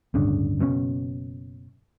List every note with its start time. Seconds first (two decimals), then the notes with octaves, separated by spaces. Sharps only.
0.14 D1 G1 C#3 D4
0.59 F#1 B2 C4 C#4